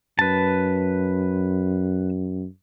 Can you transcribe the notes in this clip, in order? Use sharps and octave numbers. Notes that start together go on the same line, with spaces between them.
F#2 B4 A5